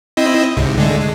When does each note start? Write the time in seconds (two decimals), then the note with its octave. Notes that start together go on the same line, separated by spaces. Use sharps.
0.17 C4 E4 D#5
0.57 C#2 G#2 C3
0.78 D3 G#3 A3
1.00 G#3